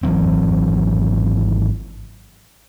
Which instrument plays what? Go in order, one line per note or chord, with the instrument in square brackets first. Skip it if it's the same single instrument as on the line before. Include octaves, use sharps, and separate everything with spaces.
[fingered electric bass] G#1 E3 F#3 C4